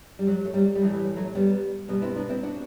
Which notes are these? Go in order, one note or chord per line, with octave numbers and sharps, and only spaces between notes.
G3
F#3
A3
G3
G3
A2 E3 F#3
G3
F#3 A3
G3 B3
B2 G3 B3
C4 E4
B3 D4
C4 E4
D4 F#4